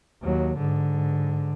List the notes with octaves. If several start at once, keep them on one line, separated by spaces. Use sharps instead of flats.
D#2 F#3
G#2 D3